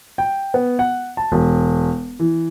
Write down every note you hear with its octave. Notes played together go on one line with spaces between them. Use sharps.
G5
B3
F#5
A5
E1
E3